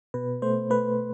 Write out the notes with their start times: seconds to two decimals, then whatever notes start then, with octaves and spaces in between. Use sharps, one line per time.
0.14 B2 B4
0.42 A3 C5
0.70 A3 B4